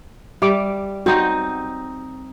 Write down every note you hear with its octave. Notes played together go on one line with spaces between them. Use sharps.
G3 E5 D6
C4 D#4 F#4 D#5